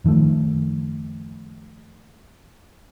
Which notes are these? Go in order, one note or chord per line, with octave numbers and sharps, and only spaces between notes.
F#2 D#3 F3 A3